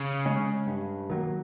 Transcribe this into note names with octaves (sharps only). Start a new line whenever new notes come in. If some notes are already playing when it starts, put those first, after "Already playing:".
Already playing: C#3
G#3 C#4
G2
D#3 F#3 A#3